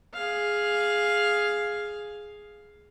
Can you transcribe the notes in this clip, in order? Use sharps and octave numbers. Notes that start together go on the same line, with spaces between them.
G#4 F5